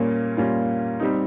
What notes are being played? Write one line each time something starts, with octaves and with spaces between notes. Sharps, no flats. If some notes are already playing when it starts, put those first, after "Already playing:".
Already playing: A#2 G3 A#3 C#4 F4
A#2 G3 A#3 C#4 F4
G3 C4 D#4